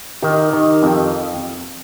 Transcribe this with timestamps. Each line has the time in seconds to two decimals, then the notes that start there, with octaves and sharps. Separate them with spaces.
0.22 D#3 D#4 G4
0.53 D#3
0.83 F2